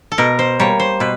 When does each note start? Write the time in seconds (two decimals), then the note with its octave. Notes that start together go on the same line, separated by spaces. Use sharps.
0.12 A4
0.18 B2 A#4
0.39 C5
0.60 G3 A#3 C#5
0.80 C5
1.00 B2 B4